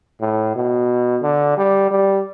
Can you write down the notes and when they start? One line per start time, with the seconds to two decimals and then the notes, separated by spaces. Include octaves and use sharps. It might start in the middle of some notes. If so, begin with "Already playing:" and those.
0.21 A2
0.56 B2
1.22 D3
1.57 G3
1.91 G3